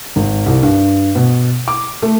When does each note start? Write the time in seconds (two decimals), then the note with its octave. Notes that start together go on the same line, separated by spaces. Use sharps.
0.16 G#1
0.46 C2
0.63 G2
1.15 B2
1.68 D6
2.02 A3